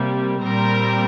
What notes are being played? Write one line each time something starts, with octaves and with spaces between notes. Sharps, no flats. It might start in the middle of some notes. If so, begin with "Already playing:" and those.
Already playing: C3 G3 A#3
A#2 G3 C4 A#4